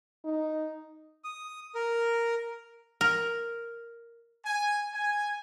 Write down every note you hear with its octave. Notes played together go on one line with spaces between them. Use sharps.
D#4
D#6
A#4
A#4
G#5
G#5